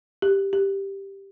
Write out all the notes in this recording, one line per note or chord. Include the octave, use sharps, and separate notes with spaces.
G4
G4